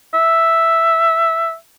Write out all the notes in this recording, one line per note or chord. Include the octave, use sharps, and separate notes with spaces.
E5